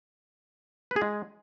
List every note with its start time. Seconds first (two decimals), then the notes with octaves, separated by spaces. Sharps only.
0.91 B4
0.96 G#4
1.02 G#3